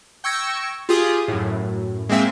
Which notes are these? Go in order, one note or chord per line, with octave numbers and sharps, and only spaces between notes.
G5 C#6 E6 G#6 A#6 C#7
F4 G4 G#4 D#6
F#2 A2
G#3 A#3 C4 E5